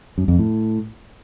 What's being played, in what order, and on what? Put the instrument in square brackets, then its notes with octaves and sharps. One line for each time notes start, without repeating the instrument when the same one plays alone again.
[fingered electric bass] F#2
F2
A2